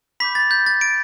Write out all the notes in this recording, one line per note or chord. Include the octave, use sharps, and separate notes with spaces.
B5 D6 G6 B6
A6
G6
A6
D7